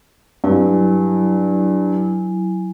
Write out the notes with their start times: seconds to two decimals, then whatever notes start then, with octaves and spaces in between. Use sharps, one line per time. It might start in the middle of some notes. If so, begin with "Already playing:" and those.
0.44 G2 F#3 E4 G#5